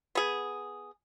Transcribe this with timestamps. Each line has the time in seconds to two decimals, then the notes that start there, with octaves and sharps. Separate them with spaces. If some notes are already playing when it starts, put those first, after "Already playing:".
0.15 B3 G#4